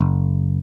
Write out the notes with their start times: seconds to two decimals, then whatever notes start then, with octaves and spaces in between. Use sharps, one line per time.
0.01 F#1